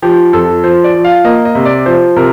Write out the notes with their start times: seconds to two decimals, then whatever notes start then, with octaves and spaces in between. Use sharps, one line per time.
0.02 F3 G4
0.33 F2 A4
0.64 F3 C5
0.84 D5
0.94 F3
1.04 F5
1.25 A#3 D#5
1.45 D#5
1.55 C3
1.65 D5
1.86 F3 C5
2.16 C3 A#4